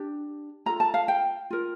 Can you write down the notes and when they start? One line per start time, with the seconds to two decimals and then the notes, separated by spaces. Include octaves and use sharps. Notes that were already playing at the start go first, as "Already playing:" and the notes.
Already playing: D4 G4
0.66 F4 A4 A#5
0.80 A5
0.94 F5
1.08 G5
1.51 F4 A#4